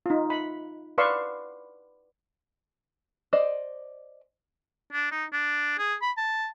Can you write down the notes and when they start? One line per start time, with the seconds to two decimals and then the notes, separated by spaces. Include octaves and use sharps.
0.06 D#4 F4
0.30 B5
0.98 B4 D5 F5 C6 C#6 E6
3.33 C5 D5 D#5
4.93 D4
5.11 D#4
5.33 D4
5.78 G#4
6.02 B5
6.17 A5